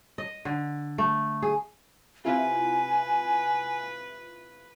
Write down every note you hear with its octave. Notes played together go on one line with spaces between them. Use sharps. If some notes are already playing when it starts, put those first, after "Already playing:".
D#5
D3
A3
G#4
C3 E4 F4 B4 G#5